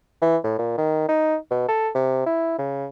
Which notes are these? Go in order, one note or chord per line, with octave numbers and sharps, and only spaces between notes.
E3
A2
A#2
D#3
D#4
B2
A4
C3
E4
C#3